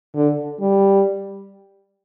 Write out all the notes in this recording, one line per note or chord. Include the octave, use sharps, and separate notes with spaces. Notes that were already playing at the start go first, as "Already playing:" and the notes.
D3
G3